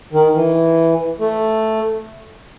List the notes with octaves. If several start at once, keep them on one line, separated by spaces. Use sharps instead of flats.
D#3
E3
A3